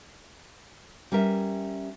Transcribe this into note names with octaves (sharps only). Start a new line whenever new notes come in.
G3 C#4 A#4 E5